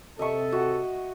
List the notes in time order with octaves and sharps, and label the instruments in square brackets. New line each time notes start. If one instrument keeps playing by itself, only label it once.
[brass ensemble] C3 A4 [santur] D#5 E5 C#6
[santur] F#4